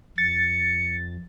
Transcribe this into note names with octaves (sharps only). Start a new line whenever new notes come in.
F2 A6 C#7